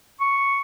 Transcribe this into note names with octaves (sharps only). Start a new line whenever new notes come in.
C#6